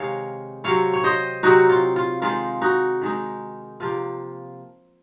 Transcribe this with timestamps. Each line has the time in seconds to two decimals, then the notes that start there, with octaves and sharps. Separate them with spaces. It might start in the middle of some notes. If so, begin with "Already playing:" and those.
Already playing: C3 D#3 G#3 C#5 F5
0.64 C3 F#3 C4 C#5 F5
0.93 C#5
1.04 C5 D#5
1.43 C3 F#3 C4 D#4 F#4
1.69 F4
1.96 F4
2.22 D#3 G#3 D#4 F4
2.61 D#4 F#4
3.01 D#3 G#3 D#4
3.80 C3 F3 A#3 F4